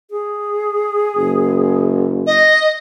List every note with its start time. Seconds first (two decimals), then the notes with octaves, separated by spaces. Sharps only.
0.10 G#4
1.16 F#1
2.26 D#5